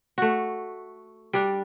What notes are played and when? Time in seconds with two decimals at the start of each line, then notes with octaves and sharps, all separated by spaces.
0.18 A3 F#4
1.33 G3 D4